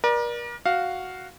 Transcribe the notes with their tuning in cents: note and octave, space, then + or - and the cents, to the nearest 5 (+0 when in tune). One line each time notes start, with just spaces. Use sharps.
A#4 +40 D5 +20
F#4 +0 F5 +0